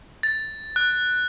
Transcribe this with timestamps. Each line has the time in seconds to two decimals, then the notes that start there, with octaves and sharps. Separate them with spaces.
0.23 A6
0.76 F#6